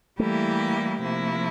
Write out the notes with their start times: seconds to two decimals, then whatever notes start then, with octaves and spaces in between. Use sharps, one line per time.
0.19 E3 G3 A3 A#3 E4 G4
1.00 C3 F3 A#3 E4